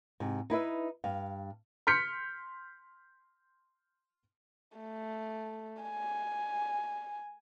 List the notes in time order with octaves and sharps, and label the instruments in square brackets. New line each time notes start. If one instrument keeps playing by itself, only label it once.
[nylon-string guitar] G#2 C3
D#4 E4 B4 E5
G2 F5
[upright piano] C6 F6 G6 B6 C#7
[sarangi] A3
G#5